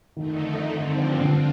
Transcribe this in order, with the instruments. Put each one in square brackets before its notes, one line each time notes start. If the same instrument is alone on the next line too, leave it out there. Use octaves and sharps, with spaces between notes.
[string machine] F2 D3 A3 D#4 [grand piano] D#3
[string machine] G2 D3 F3 C4
[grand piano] D3 [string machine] D4 F4